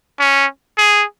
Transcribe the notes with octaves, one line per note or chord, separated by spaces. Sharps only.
C#4
G#4